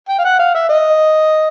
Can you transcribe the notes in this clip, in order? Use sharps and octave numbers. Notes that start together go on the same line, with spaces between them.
G5
F5
F#5
F5
E5
D#5